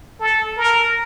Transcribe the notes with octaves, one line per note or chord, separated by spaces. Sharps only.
A4
A#4